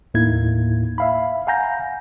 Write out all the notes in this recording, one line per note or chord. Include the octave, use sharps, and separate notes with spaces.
D#2 A2 A#3 D#4 E4 G#6
E5 F5 B5
F5 F#5 G#5 A#5 G6 A#6